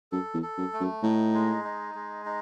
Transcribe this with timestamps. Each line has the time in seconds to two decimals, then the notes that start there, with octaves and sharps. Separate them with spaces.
0.12 F#2 A4
0.34 E2
0.42 A4
0.58 F#2
0.73 A3
0.80 F#2
1.03 A2 D#4
1.34 G#3
1.64 D#4
1.95 G#3
2.26 D#4